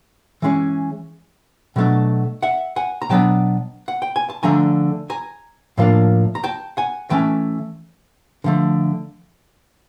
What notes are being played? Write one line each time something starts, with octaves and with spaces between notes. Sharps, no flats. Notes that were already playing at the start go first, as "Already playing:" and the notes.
E3 G#3 C#4
B2 F#3 A3 D4
E5 F#5
F#5 G#5
A#5
B2 F#3 B3 D4 G5 A5
F#5
G5
G#5
A5
D3 F3 A3 D4 G#5 A#5
G#5 A#5
A2 F3 A#3 D4
A#5
G5 A5
F#5 G#5
E3 A3 C#4 G5 A5
D3 F3 A3